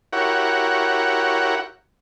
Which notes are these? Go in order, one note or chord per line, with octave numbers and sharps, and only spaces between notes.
E4 F#4 G4 A#4 C#5 F#5